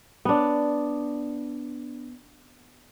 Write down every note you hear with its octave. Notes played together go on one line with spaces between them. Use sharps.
B3 D4